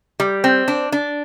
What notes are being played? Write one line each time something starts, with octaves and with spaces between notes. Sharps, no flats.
G3
C4
D4
D4